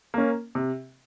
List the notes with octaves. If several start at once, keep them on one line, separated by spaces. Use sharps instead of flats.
A#3 C#4
C3